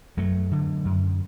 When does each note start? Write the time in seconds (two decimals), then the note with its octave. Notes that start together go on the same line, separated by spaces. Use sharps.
0.17 F#2 F#3 A3
0.51 D3
0.85 F#2